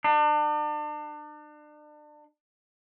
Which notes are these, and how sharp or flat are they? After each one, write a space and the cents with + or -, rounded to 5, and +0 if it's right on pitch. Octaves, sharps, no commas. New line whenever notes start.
D4 +35